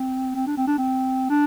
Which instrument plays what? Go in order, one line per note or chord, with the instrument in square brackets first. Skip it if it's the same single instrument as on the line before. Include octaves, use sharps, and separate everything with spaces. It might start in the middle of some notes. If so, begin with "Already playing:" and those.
Already playing: [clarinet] C4
C4
D4
C4
D4
C4
D4